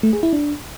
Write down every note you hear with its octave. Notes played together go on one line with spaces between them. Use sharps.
A3
G#4
E4
D4